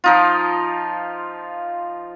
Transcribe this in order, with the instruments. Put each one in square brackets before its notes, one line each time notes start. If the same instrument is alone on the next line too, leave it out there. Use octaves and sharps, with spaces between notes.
[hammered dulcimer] F3 D#4 F4